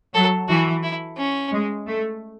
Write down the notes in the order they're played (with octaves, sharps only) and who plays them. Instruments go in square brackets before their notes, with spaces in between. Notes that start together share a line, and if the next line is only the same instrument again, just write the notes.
[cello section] F#3 [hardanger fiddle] A4
[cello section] E3 [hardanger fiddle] F#4
[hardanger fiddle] E4
C#4
[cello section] G#3
A3